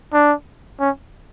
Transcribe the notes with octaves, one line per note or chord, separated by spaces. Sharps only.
D4
C#4